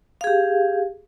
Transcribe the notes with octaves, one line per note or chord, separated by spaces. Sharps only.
G4 G#4 F5